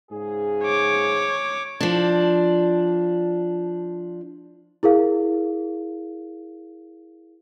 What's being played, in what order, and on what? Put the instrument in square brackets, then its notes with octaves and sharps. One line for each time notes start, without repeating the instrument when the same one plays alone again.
[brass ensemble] G#2 C#3 G#4
[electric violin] C#5 D6
[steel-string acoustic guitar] F3 D4
[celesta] E4 G#4 A#4 F5